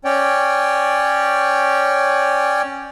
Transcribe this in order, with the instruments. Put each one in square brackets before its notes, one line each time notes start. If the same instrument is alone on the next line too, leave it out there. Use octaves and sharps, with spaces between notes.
[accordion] C#4 C#5 D5 G5